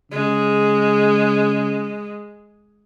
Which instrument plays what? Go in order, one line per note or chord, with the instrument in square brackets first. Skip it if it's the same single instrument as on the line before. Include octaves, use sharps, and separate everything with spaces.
[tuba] C#3 [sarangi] G#3